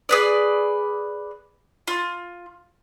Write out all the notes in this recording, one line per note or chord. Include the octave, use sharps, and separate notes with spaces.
G#4 B4 D5
F4